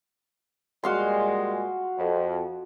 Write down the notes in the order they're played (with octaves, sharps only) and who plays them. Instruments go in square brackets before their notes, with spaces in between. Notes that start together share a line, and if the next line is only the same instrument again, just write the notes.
[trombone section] A#2 G3 G#3 [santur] F#4 F5 C6
[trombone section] F2